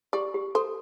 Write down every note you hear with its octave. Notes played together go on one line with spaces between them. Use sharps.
G4 D5
G4
A4 C5